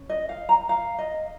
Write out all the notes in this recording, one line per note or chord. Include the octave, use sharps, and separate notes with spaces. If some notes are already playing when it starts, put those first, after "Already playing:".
Already playing: C#4
D#5
F5
A#5
F5
D#5